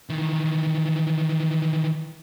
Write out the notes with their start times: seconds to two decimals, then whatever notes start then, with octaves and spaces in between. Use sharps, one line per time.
0.10 D#3 E3